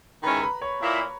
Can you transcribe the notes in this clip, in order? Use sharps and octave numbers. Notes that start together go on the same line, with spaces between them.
D#3 G#3 C#4 E4 B4 B5
A#5
B4 B5
C#5 C#6
A#2 A#3 E4